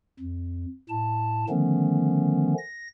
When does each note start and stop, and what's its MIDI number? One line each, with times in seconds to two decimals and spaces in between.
0.20 0.66 41
0.89 1.45 45
0.89 1.45 81
1.50 2.54 50
1.50 2.54 51
1.50 2.54 53
1.50 2.54 57
1.50 2.54 59
1.50 2.54 61
2.58 2.88 94